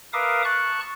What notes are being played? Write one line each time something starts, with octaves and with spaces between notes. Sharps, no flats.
A#4 B4 E5 F5 D6 D#6
A5 C#6 F#6